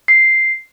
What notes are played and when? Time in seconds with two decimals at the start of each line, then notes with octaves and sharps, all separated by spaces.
0.08 C7